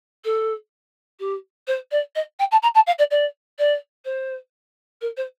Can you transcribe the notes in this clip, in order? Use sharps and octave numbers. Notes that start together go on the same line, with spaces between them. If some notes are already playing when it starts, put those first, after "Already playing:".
A4
G4
C5
D5
D#5
G5
A5
A#5
A5
F5
D5
D5
D5
C5
A#4
C5